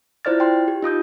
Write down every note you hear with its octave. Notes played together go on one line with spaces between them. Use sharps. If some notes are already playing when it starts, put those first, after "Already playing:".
E4 F4 C5 D5 F6 A6
G5 C6
G4
D#4 F4 D#6 G6